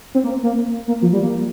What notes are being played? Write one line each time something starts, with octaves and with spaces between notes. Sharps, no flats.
C4
A#3
A#3
A#3
F3
G3
A#3